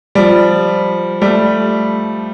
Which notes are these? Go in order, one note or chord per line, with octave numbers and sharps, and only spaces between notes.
F3 G3
G3 A3